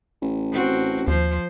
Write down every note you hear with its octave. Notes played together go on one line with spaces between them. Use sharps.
A1
C4 F#4
D#2 F3 C5